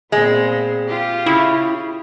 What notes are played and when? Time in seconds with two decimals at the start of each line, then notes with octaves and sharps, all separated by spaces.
0.12 A#2 G#3 B3 C4
0.88 F4 G4
1.26 C#3 E4